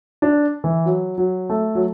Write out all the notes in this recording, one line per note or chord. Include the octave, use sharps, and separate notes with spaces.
D4
E3
F#3
F#3
A3
F#3